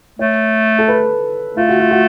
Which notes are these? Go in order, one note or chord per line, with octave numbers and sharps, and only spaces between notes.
A3 C#5
A4
B4
A3 F4
F#4
F4
F#4